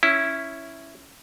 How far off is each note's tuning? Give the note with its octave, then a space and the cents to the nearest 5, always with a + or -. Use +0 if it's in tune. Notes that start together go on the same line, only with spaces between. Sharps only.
C#4 +0 E4 +0